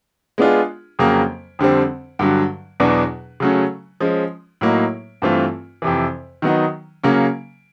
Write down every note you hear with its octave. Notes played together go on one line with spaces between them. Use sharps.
G#3 B3 D4 F4 G#4
F2 C#3 F#3 A#3
F2 D3 G3 C4
G2 D3 F#3
E2 B2 F#3 B3 D4
C#3 F#3 A3 C#4
F3 G#3 C#4
A2 F#3 A#3 D#4
G2 E3 A3 C4 F4
F2 C3 E3
D#3 F#3 B3 D#4
C#3 F#3 A#3 C#4